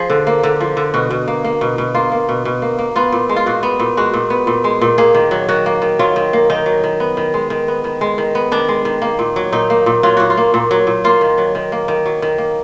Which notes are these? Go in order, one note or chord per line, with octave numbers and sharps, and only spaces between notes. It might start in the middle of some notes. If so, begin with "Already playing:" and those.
Already playing: F3 G#4
D3
A#3
D3
F3
D3
B2 F#4
B2
A#3
A#3
B2
B2
A#3 F4
A#3
B2
B2
A#3
A#3
B3 F4
A#2
G#3
F4
A#2 F#4
B3
A#2
G#3 F#4
A#2
B3
A#2
G#3
A#2
A#3 G#4
D#3
F#3
D#3 F#4
A#3
D#3
F#3 F4
D#3
A#3
D#3 D#4
F#3
D#3
B3
D#3
G#3
D#3
B3
D#3
G#3
D#3
B3
D#3 D4
G#3
D#3
A#3
A#2
F#3
A#2 D#4
A#3
A#2
F#3 F4
A#2 F#4
F4
A#3
A#2
F#3
A#2
A#3 F4
D#3
F#3
D#3
A#3
D#3
F#3
D#3
A#3